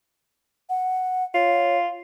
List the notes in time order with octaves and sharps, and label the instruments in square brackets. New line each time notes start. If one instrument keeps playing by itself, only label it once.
[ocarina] F#5
[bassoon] F4 [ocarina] C#5